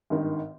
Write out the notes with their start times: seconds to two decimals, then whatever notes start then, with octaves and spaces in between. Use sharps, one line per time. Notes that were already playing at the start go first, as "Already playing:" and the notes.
0.10 G#1 G2 D#3